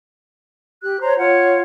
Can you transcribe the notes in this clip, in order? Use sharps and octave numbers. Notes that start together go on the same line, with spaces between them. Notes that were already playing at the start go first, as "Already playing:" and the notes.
G4 F#6
C5 C#5 A#5
F4 C#5 F#5